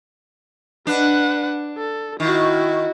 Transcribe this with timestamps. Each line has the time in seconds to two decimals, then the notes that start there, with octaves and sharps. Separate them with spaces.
0.87 D4 B4 F#5
1.78 A4
2.20 D#3 E4 F#4